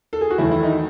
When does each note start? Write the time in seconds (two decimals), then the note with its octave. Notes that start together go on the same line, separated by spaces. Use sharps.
0.13 A4
0.21 G#4
0.31 F#4
0.38 E2 D#3 F#3 A3 E4
0.52 E4
0.63 D#4